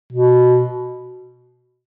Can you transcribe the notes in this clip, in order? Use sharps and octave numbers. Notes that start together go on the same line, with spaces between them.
B2